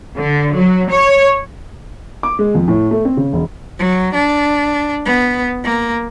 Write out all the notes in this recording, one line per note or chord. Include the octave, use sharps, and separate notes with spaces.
D3
F#3
C#5
D6
G#3
F2
A2
A3
C4
C#3
E1
F#3
D4
B3
A#3